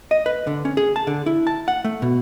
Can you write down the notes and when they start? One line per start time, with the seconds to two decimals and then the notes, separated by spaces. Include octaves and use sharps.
0.11 D#5
0.26 B4
0.47 D3
0.65 C#4
0.77 G#4
0.96 A5
1.07 D3
1.26 E4
1.47 A5
1.68 F#5
1.85 A3
2.02 B2